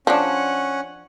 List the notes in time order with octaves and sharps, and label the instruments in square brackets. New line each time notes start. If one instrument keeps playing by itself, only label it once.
[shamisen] F3 D4 [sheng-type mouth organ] C#4 F#5